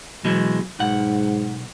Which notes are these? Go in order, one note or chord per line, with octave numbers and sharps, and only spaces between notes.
B2 E3 F#3 G#3
B1 G#2 F#5